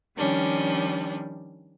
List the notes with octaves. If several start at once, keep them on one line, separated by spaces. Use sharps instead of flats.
D#3 F3 G3 C#4 D4